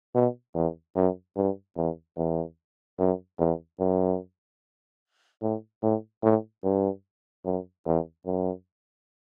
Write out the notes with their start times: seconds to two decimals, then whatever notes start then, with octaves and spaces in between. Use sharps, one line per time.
0.15 B2
0.55 E2
0.96 F#2
1.37 G2
1.77 E2
2.17 E2
2.99 F#2
3.40 E2
3.80 F#2
5.42 A2
5.83 A2
6.23 A2
6.64 G2
7.45 F#2
7.86 E2
8.26 F#2